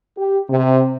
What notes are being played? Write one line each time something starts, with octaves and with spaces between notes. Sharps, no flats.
G4
C3